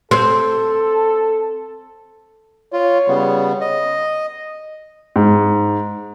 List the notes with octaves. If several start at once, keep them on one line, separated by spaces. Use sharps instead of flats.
C4 A4
F4 C#5
C#3 G3 B3
D#5
G#2